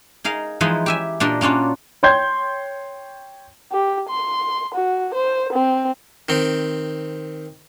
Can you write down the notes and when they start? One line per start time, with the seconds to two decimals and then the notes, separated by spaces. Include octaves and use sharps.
0.24 D#4 G#4 A#4 F5
0.61 E3 F3 G#3 D#4 G#4 B4
0.86 G4 E5 G#5
1.20 A#2 D4 G4 A#4 D#5
1.41 A#3 C#4 D4 F4 F#4
2.03 C#5 G5 C6 G6 G#6
3.72 G4
4.09 C6
4.74 F#4
5.14 C5
5.53 C4
6.29 D#3 C4